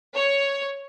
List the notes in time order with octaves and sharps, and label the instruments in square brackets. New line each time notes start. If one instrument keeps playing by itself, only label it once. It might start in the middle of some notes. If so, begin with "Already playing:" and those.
[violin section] C#5